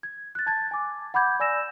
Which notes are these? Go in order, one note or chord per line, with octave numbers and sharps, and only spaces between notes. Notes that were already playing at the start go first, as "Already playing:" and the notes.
G#6
F#6 A6
A5 G#6 A6
G#5 D6
F#5 B5 D6 G6 G#6
D5 G#5 E6 A#6 E7